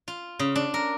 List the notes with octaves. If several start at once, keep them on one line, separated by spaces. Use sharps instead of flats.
F4
C#3
D4
A#4